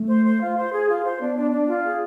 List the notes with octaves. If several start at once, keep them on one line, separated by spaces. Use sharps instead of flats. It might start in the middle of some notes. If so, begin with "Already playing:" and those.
Already playing: A3
C5
C5
F4
C5
G#4
F4
C5
B3 D4
D4
D4
F4
G#4